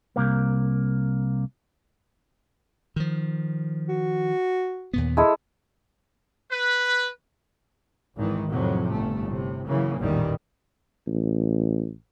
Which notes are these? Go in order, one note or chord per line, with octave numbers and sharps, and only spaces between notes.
C2 A#3
D#3 F3
F#4
D#2 A#2 B3
G#3 E4 A4
B4
G#1 D#3 E3
F2 A2 C3 F#3
G1 A3
A2 C3
C#3 E3 F#3 A#3
A1 E2 A#2 D#3 G3
A1